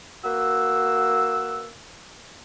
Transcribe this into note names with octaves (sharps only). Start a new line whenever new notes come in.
A#3 F#4 B4 E6